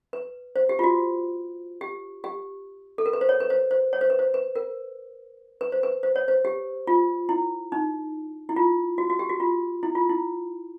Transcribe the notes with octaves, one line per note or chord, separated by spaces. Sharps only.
B4
C5
G4
F4
F#4
G4
G4
A4
A#4
B4
C5
C#5
B4
C5
C5
C#5
C5
B4
C5
B4
A#4
B4
C5
B4
C5
C#5
C5
G4
F4
E4
D#4
E4
F4
F#4
F#4
G4
F#4
F4
E4
F4
E4